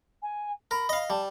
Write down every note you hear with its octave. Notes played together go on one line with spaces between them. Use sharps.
G#5
A#4 B5
D#5 F5
G3 A5